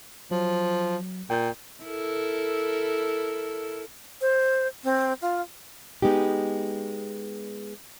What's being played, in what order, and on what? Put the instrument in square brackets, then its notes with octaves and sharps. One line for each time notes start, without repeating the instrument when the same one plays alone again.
[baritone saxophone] F3 [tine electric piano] F#3
[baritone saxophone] A#2 [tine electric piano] G5 G6
[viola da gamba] E4 A4 A#4
[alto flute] C5
C4
F4
[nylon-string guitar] G#3 B3 D#4 G4